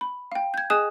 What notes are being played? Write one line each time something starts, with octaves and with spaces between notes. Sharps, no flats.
B5
F5 G5
G6 G#6
G#4 D#5 G#5 D#6 F#6 E7